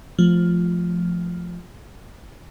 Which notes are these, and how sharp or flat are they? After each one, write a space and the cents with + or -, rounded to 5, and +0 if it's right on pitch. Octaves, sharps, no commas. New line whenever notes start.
F3 +0 A3 -15